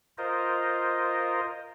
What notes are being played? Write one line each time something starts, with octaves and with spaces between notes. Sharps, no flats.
F4 A#4 C5 D#5